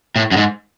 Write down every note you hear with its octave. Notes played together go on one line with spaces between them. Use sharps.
A2
F#2
G#2